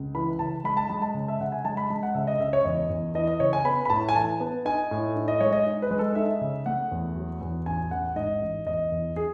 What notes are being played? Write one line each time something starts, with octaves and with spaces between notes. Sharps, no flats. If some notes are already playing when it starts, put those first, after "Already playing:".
Already playing: C#2
E3 B5
C#3 A5
G#3 B5
A5
G#3 B5
A5
C#3
E5
C#3 F#5
G#5
G#3 A5
B5
G#3 A5
F#5
C#3 E5
D#5
C#2 E5
C#5
E2 D#5
E2
E3 D#5
D#5
C#3 C#5
G#5
B3 B5
B5
A2 A5
G#5
E3 A5
B3
D#4 G#5
A2
D#4
D#5
G#3 C#5
D#5
D#4
B4
G#3
A4
D#4 E5
C#3
A3 F#5
E2
F#3
E2
A1 G#5
A1 F#5
G#2 D#5
A1
E2 D#5
E2
G#4